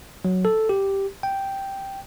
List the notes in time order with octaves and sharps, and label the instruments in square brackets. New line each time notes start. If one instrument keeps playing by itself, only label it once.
[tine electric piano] F#3
A4
G4
G5